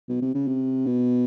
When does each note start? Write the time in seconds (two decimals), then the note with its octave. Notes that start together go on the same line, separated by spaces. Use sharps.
0.09 B2
0.22 C3
0.34 C#3
0.48 C3
0.87 B2